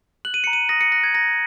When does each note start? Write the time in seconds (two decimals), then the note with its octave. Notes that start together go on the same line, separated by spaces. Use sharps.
0.25 F#6 F#7
0.34 D#7
0.44 A#5 C#7
0.53 D#7
0.69 D#6 A#6
0.81 C#7
0.92 F#6 A#6
1.04 G#6
1.14 A#5 A#6